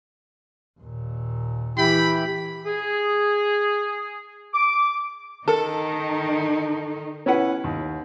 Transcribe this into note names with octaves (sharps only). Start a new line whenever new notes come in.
D#2 A#2
E3 E4 G4 G5 B5
G#4
D6
D#3 D#4 A4 A#4
C#4 E4 B4 F#5
D#2